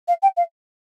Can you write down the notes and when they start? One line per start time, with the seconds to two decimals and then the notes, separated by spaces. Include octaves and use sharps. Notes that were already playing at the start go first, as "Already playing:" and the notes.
0.08 F5
0.22 G5
0.37 F5